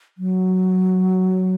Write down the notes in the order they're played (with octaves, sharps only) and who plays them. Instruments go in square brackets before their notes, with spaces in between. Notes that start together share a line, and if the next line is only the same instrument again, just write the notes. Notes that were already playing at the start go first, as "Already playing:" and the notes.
[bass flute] F#3